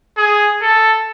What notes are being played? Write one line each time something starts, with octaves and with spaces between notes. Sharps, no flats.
G#4
A4